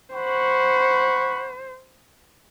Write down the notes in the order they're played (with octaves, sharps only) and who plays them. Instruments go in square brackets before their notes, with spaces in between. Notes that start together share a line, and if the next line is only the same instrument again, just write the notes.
[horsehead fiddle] C5 [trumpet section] F#5 B5 C#6